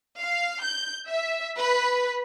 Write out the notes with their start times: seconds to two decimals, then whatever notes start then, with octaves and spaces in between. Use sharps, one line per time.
0.19 F5
0.62 G6
1.10 E5
1.58 B4